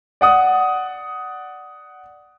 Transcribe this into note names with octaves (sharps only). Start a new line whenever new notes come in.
D5 F#5 D#6